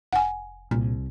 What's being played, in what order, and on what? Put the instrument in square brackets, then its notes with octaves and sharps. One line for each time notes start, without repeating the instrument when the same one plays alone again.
[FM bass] F1 [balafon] F#5 G#5
[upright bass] C2 [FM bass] A#2